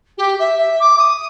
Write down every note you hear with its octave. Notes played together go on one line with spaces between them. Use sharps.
G4
E5
E5
D6
D#6